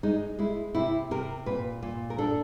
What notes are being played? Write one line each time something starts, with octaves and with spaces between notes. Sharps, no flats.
G#3 D#4
G#3 E4
C3 E4
C3 A#4
A#2 B4
A#2
A#4
D4 A4